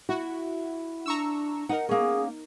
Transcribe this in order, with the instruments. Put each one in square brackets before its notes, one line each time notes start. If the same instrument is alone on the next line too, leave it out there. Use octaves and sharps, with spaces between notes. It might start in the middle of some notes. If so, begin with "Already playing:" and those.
[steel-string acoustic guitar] E4 [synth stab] F#4
[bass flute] D4 [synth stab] A#5 C#6 E6
[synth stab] D#4 A#4 [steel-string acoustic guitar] F#5
[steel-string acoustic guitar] A#3 C#4 [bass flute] G#4